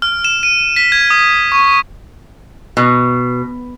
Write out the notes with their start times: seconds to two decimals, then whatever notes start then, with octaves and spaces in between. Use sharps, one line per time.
0.02 F6
0.25 E7
0.43 D#7
0.76 B6
0.92 G#6
1.10 D#6
1.52 C#6
2.77 B2